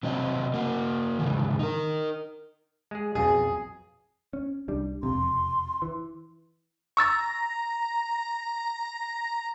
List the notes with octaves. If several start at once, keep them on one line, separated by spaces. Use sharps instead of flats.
C3 F#3 C4 D#5
A#3 F#4
G#2 C#3 E3
D#4 A#4
G#3 G#4
B1 F2 B2 G#4
C#4
C2 G3 D4
E1 F2 C3 C6
E3
A#5 C#6 E6 A6